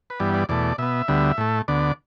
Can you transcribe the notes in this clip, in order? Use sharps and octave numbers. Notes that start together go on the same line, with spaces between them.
B4
G2 E3 G3 B3 D5
D5
E2 B2 A3 D5
B2 B3 E5
D2 D3 G3 B3
A2 A3
D2 D3 B3 D5